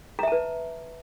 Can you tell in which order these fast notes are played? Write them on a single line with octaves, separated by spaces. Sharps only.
A#5 E5 A5 B4